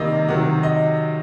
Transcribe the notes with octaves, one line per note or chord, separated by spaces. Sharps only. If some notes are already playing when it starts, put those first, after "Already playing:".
Already playing: C3 D#3 G3 A#3 D#5
C3 D#3 F#3 F#5
D#5